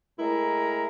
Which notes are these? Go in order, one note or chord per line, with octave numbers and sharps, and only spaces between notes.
A2 G#3 E4 A#4 A#5